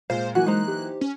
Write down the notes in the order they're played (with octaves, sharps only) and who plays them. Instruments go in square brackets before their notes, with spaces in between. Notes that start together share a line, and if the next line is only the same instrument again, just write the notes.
[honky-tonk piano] A#2 G#3 [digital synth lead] C5 [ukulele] F5
[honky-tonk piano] E3 F#3 A#3 [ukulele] F#4 [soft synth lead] G#5 [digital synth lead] F#6
[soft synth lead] G#3 [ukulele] D#4 C5 A#5
[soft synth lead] G4
[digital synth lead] C#4